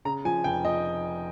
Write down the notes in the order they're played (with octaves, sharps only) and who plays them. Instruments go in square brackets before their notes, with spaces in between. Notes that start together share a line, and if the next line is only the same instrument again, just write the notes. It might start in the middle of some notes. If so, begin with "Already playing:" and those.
[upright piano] C#3 A#5
F3 G#5
F1 G5
F3 D#5